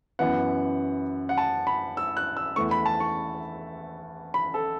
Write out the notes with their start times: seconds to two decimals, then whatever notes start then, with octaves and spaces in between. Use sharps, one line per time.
0.19 F#2 E3 B3 F#5
1.29 F#5
1.38 A5
1.67 B5
1.97 E6
2.17 F#6
2.37 E6
2.56 E2 E3 A3 C#6
2.71 B5
2.86 A5
3.00 C#6
4.34 B5
4.54 A4